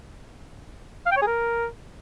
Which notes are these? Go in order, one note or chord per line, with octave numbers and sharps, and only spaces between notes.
F5
G5
C#5
G#4
A#4